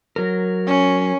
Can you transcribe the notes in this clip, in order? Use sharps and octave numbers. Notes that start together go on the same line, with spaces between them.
F#3 A#4
C#4